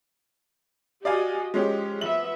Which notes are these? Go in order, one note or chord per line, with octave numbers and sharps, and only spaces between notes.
F#4 G4 D5 D#5 F5 G#5
F3 G#3 C#4 G4
F3 B3 E5 F#7